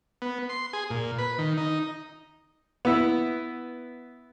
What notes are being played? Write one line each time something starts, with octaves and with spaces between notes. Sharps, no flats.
B3
C6
G#4
A#2
B4
D#3
D#4
B3 E4